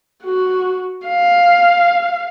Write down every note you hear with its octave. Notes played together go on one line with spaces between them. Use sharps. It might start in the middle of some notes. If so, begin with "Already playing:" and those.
F#4
F5